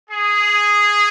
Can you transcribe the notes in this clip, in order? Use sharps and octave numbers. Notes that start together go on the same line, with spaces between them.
G#4